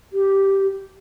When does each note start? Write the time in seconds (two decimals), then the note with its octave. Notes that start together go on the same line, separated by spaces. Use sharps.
0.13 G4